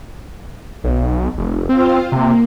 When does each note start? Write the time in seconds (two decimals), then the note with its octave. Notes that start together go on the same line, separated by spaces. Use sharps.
0.84 B1
1.38 F1
1.69 C4 F4 C5 F5
2.12 C3 A#3